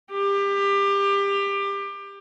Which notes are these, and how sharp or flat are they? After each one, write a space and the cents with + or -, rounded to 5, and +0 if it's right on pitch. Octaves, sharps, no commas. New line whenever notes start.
G4 +25